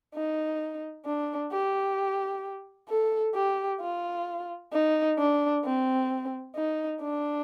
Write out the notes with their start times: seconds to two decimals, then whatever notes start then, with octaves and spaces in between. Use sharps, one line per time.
0.15 D#4
1.05 D4
1.52 G4
2.89 A4
3.35 G4
3.81 F4
4.73 D#4
5.18 D4
5.65 C4
6.55 D#4
7.01 D4